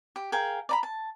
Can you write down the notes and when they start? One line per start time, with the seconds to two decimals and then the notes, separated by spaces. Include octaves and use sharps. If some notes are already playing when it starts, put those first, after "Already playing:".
0.16 G4
0.32 G#4 A#4 F5 G5
0.69 D5 A#5 B5
0.83 A5